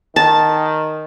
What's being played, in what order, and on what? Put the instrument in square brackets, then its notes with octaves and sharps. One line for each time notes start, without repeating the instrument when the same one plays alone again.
[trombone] D#3 [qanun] A5